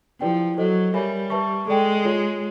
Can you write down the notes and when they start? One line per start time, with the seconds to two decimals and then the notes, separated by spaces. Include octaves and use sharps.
0.20 F3 E4 G4 B4 D5 G5
0.57 F#3 F#4 A4 C5 D#5
0.94 G3 A#4 C#5 E5 G#5 B5
1.30 B4 E5 A5 C#6
1.67 G#3 A4 D5 G5
2.05 F4 G#4 C#5